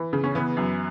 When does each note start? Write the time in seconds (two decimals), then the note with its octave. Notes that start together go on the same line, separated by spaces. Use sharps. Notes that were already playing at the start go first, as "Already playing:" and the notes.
Already playing: E3
0.13 C#3
0.24 C#4
0.35 E3 B3
0.57 F#2